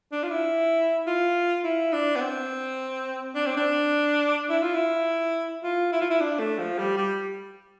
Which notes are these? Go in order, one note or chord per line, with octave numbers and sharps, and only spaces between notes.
D4
F4
E4
F4
E4
D4
B3
C4
D4
C4
D4
E4
F4
E4
F4
E4
F4
E4
D4
A3
F3
G3
G3